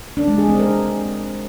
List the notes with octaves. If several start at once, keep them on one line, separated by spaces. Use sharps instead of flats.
D4
G#3
G#4
C4
A#4